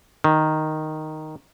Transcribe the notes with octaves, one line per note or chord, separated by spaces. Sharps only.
D#3